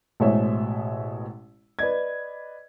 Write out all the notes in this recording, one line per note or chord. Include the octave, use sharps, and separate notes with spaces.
A1 B2 G#3 C5 C#5 E5
B4 D5 D#5 G#6